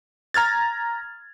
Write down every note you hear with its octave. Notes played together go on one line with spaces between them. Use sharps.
A#5 F6 G#6 A6